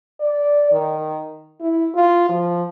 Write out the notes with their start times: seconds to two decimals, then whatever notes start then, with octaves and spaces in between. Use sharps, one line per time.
0.20 D5
0.72 D#3
1.61 E4
1.95 F4
2.29 F3